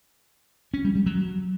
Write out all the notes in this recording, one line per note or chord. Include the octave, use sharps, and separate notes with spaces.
C#4
G3
G3
F#3